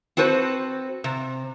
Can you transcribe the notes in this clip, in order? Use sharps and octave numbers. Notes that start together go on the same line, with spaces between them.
C4 F#4 A4 B4 C5
C3